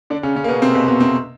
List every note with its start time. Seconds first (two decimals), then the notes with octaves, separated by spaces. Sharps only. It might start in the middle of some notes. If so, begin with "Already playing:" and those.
0.10 D3 D4
0.23 C#3 C#4
0.36 C#3 C#4
0.44 A#3
0.48 B2 B3
0.62 C3 C4
0.75 B2 B3
0.88 B2 B3
1.00 C3 C4